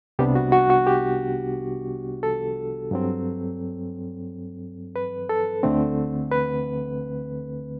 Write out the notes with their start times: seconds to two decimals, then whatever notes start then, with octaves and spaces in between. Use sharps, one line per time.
0.19 C2 C3 G3 B3 D4 G4
0.35 F#4
0.52 F#4
0.70 F#4
0.87 G4
2.23 A4
2.91 G2 F#3 C4
4.96 B4
5.29 A4
5.63 D2 D3 A3 C4
6.31 B4